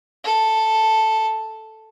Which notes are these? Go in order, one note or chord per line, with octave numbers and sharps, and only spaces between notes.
A4